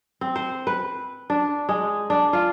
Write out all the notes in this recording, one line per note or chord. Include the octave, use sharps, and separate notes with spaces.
C4
C5
B4
D4
G#3
D4
F4